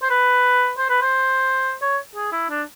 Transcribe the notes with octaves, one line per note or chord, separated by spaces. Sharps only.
C5
B4
C5
B4
C5
C#5
G#4
E4
D4